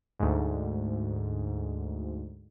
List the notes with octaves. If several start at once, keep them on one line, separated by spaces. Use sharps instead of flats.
D2 G#2